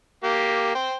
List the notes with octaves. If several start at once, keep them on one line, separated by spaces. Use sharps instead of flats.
A#3 G4
C5 G5